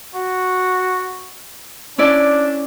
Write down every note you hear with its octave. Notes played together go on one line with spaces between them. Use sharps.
F#4
C#4 D4 E4 D5